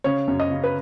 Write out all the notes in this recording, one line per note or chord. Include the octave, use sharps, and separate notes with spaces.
C#3 C#5
F#2
D#5
C#3
B4